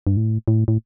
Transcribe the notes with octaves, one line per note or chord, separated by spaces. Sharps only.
G2
A2
A2
A2